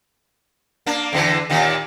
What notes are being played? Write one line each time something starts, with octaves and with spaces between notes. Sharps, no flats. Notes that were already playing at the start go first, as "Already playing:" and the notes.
A#3 D4
E2 D3 E3
D#2 A#2 D#3